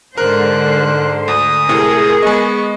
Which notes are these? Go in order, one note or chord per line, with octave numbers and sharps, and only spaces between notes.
G#2 D3 A#4 C5 F#6
D2 D#6
A2 C3 G#4 A#4
G#3 B3 D#5 C#6